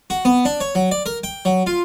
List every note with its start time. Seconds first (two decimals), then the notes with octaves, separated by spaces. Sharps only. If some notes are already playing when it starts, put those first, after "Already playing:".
0.10 F#4
0.25 B3
0.45 D4
0.60 C#5
0.75 F#3
0.91 D5
1.06 A#4
1.24 G5
1.45 F#3
1.66 F4